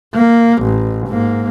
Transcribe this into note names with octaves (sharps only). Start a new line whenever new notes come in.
A#3
A1
G#2 A#3